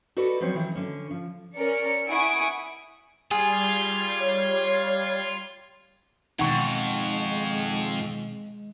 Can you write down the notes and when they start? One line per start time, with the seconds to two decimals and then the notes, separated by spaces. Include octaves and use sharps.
0.16 F#4 A4 B4 D5 D#5
0.40 F3 F#3 C4 C#4 B4 C#5
0.54 D#3 E3 F#3
0.75 D3 C#4
1.11 F3
1.55 C#4 A#4 D5 C#7
2.09 E4 F#5 G#5 C#6 D#6 D7
3.31 G3 F4 G#4 G#6 C7
4.20 C#5
6.39 F2 B2 D#3 G#3 D#4 F#5 C#6